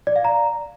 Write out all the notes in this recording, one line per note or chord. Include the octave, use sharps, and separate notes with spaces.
D5
F5
A#5